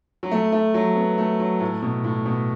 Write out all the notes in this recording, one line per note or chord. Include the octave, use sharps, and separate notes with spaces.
F#3
A3
A3
F#3
B3
A3
F#3
A2
B2
A2
B2